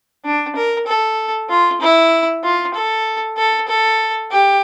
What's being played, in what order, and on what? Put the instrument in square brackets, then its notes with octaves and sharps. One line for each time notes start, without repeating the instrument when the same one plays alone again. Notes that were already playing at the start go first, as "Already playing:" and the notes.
[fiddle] D4
A#4
A4
F4
E4
F4
A4
A4
A4
G4